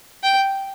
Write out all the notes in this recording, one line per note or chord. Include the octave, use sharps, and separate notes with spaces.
G5